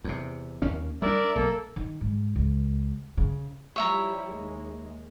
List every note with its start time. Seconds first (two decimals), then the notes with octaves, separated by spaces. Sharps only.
0.04 E2 C3
0.62 D#2 A#3 C#4
1.02 G3 D4 A#4 D5 E5
1.35 B1 A#3 A4
1.76 D#3
2.01 G#2
2.36 C#2
3.17 C#3
3.76 F3 G3 E4 C#5 E5 A#5
4.31 D#2 G#3